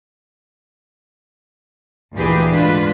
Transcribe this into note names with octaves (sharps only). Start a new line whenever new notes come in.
D2 A#2 E3 G4 G#4 B4
G#2 D3 G#3 D4 F4 B4